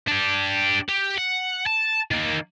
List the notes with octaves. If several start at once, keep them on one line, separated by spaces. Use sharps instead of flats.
D4 G4
G4
F#5
A5
D#3 A#3